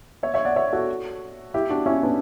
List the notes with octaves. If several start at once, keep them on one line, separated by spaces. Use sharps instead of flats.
C#5 E5
C#5 E5
D5 F#5
C#5 E5
F#4 A4
E4 G4
D4 F#4
C#4 E4
B3 D4